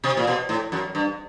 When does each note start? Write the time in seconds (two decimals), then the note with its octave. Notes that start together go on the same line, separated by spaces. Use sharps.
0.04 C3
0.17 A#2
0.27 B2
0.49 A2
0.72 F#2
0.95 G2